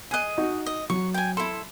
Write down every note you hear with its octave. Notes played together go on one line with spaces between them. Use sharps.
G#4 D#5 G#5 F#6
D#4 F#4
D#5
F#3 C#6
G5 G#5
E4 A4 C6